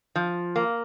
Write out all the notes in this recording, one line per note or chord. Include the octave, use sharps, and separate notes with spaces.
F3
A#3